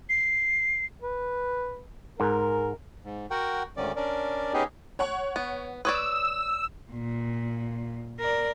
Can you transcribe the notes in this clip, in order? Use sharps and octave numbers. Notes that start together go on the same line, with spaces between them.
C7
B4
G#2 A#4
G#2
F#4 A#4 F#5 G5
D2 G#2 D#3 C#4 D5
C#4 D4 A#4 D5
B3 C#4 D#4 G4 G#4
C#5 F#5 C#6
B3
B4 C#5 D5 D#6 E6
A#2
A#4 D5